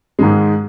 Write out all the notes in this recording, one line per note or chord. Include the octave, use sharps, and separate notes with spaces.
G#2 D#3 G#3